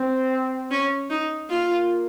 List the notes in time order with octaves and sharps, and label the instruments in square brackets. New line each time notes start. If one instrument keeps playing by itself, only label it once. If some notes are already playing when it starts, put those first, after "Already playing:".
Already playing: [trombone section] C4
[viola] C#4
D#4
[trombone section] A#3 [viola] F4